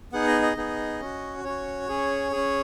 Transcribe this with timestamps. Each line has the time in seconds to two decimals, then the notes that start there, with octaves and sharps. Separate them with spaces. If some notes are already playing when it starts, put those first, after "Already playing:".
0.13 B3 D#4 G#4 F#5
0.27 D#5
0.42 D#5
0.57 B3 D#4 G#4
1.00 C#4 F#4
1.44 C#4 F#4 C#5
1.88 C#4 G#4
2.32 C#4 G#4